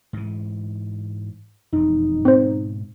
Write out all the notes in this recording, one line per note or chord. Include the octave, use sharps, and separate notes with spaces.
G#2 E3
E1 F2 D#4
G#2 B2 C4 C5